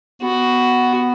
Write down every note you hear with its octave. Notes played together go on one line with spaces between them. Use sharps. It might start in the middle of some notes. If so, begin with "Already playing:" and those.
B3 F#4